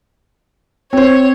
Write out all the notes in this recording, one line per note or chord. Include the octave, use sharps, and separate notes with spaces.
C4 C5 C#5